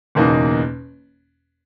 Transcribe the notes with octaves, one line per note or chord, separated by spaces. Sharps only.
F#1 E2 B2 A#3 D#4